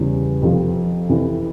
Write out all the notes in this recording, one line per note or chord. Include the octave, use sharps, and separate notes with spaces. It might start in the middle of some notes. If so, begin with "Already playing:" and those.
Already playing: E2 C#3 E3 G3
F2 C3 F3
F2 C3 E3